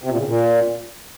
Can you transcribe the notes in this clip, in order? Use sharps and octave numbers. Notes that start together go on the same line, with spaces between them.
C3
A#2
C#3
A#2